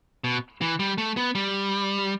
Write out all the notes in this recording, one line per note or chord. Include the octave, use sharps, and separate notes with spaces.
B2
E3
G3
A3
B3
G3